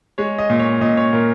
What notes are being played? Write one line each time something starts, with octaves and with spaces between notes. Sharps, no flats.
G#3 C#5
D#5
A#2
C#5
A#2 D#5
C#5
A#2 A#4